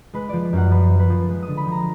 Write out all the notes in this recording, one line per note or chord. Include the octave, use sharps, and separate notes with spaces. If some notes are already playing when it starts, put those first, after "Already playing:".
G#3 B4
F3 D5
F#2 F#5
F3 B4
F3
B4
F3
G#3
D#6
D3
B5
F3 A#5